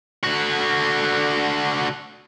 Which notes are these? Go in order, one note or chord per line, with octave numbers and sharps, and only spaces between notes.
D3 F#4